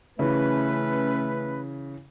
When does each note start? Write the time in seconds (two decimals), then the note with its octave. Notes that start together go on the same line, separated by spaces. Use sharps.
0.19 C#3 E3 A3 C#4 B4